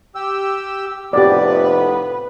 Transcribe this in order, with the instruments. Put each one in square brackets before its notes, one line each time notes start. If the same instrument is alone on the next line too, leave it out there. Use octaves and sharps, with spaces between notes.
[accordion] G4 E6
[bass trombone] F1 [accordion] A2 B3 [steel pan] G4 D5 [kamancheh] B4